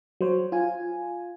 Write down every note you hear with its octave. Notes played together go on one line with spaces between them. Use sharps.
F#3 C5 C#5
F4 G#5